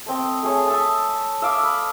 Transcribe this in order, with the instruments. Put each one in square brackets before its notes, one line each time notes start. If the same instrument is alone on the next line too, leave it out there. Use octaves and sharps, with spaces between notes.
[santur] A3 C4 D#5
A3 G#4 C#5 D#5
E5 A5
E5 F5 D6 D#6
B5